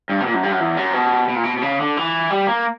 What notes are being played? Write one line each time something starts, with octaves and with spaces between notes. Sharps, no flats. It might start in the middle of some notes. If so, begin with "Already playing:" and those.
G2
B2
A#2
F#2
G2
F#2
E2
F#2
B2
B2
A#2
B2
B2
C#3
D3
E3
G3
A#3